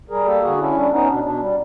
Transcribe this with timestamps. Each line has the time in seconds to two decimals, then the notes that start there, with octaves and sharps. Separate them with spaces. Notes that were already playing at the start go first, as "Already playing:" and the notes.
0.10 G3 G#4 A#4
0.26 A#3 G4 A4
0.42 D3 F#4 G#4
0.59 C#4 D4 E4
0.75 G3 D4
0.91 B3 C#4 D#4
1.07 B2 D4
1.24 B2 D4
1.40 G3